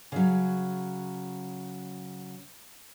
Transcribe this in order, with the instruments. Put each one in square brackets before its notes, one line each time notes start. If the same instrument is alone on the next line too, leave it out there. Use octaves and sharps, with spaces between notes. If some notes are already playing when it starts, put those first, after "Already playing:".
[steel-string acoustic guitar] C#3 F#3